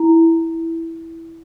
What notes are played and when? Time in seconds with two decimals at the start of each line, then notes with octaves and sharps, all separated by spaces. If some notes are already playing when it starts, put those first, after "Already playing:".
Already playing: E4